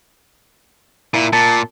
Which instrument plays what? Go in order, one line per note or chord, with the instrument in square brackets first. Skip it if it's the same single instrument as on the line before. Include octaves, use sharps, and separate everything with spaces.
[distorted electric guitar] A#2 [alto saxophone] E4
[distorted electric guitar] A#2 [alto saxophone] A5